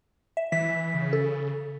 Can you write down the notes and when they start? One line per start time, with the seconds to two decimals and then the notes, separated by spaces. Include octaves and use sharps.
0.37 E5
0.52 E3 B6
0.94 C#3
1.13 A4